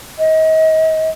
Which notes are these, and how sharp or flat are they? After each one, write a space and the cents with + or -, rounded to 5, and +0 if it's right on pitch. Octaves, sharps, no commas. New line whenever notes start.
D#5 +35